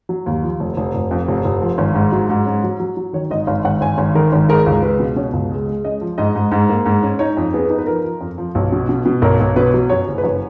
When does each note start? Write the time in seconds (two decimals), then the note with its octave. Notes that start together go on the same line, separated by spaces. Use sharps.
0.09 F#3
0.26 D#2
0.43 F3
0.60 F1
0.77 F1
0.94 F1
1.11 F2
1.28 F1
1.45 F1
1.62 F3
1.78 G#1
1.95 G#2
2.12 F#3
2.29 G#2
2.45 C#4
2.64 F#3
2.80 F#3
2.97 F#3
3.13 D#3 C#5
3.31 G#1 D#5
3.47 G#1 F5
3.65 G#1 F#5
3.81 G#1 G#5
3.98 G#1
4.15 D#3 A#4
4.33 G#1
4.49 G#3 A#4
4.66 C#2
4.82 G#3 B4
5.00 B2
5.16 B2 C#5
5.33 C#2
5.51 G#3
5.68 G#3
5.85 C#4 D#5
6.01 F3
6.18 G#2 D#5
6.36 G#2
6.52 G#2
6.69 A#3
6.86 G#2
7.03 C#4
7.19 D#4 C#5
7.37 F2
7.54 B3 G#4
7.70 D#4
7.78 B4
7.87 F3 A#4
8.04 F3
8.21 F2
8.38 F3
8.55 B1
8.72 B2
8.89 B2
9.06 B2
9.22 B1 A#4
9.40 B1
9.56 B2 B4
9.74 F#3
9.90 F#2 C#5
10.07 F#1
10.18 B4
10.24 F#2 C#5